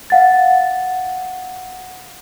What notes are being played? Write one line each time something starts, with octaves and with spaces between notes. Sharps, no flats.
F5 F#5 A6